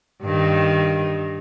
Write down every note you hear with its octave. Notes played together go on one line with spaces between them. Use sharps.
G2 D#3